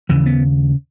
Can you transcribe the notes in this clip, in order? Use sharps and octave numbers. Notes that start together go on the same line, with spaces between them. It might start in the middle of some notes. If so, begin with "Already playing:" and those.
D#2 C#3 E3
B3